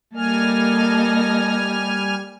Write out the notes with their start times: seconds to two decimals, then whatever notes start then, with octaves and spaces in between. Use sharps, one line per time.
0.15 G3 A#3 A4 D#5 G#5 F6